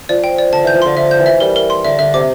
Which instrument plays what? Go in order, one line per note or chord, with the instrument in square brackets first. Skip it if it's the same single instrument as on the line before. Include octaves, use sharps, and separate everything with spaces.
[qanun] F3 [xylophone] D5
[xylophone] G5
D5
[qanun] D3 [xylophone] A5
[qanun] E3 [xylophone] G6
[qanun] F3
[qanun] D3 [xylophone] C6
[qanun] D3 [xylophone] E5
[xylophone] G6
[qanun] E3
[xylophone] E5
[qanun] G3 [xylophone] A#4
[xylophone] A#4
C6
[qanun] D3 [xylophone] E5
[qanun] D3 [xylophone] E5
[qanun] C3 [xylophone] D6